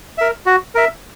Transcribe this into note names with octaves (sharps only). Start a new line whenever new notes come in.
A#4 E5
F#4
A#4 E5